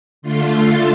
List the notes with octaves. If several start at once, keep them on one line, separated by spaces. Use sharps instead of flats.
D3 A3 F4 C6
A5